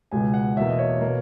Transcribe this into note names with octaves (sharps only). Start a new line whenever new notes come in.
C#2 B2 G#3 G#5
F#5
E2 B2 A#3 E5
D#5
C#5
B2 A#3